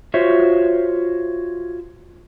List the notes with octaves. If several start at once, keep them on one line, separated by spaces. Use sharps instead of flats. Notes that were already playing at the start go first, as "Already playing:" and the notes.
F4 F#4 C5 C#5 E5